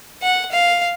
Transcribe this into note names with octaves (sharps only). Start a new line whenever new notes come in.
F#5
F5